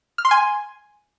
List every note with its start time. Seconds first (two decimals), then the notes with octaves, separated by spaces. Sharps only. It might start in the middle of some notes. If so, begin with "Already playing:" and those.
0.18 F6
0.25 C6
0.31 G#5